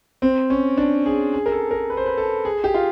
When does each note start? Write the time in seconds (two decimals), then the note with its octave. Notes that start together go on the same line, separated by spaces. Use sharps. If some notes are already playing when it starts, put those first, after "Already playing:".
0.22 C4
0.50 C#4
0.77 D4
1.06 G#4
1.33 G#4
1.46 A#4
1.52 A4
1.71 A#4
1.90 B4
1.97 C5
2.06 B4
2.17 A4
2.45 G#4
2.64 G4
2.74 F4